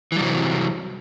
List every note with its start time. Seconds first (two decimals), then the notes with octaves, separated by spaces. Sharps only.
0.12 E3
0.16 G3
0.20 C3
0.24 F#3